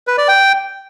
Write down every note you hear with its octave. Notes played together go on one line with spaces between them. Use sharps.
B4
D5
G5